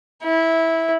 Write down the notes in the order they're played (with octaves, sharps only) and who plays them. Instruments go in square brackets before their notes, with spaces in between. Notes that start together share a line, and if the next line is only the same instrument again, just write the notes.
[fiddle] E4